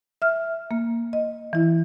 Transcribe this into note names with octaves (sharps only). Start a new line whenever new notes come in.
E5 F6
A#3
D#5
E3 E4